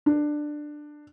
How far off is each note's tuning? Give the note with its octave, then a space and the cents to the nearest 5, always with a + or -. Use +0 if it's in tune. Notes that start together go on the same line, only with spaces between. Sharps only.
D4 +15